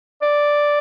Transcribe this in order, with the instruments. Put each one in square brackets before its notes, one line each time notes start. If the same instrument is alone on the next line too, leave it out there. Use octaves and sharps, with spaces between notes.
[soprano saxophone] D5